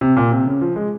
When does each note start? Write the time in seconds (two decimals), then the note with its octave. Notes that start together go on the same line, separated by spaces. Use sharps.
0.01 C3
0.17 A#2
0.31 C3
0.46 C#3
0.61 F3
0.76 G#3